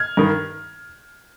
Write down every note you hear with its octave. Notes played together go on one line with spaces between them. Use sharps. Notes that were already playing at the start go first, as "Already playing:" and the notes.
Already playing: F6 G#6
G2 D#3